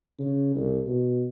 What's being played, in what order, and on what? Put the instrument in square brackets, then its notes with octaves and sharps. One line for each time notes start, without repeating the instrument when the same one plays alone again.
[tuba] C#3
C2
B2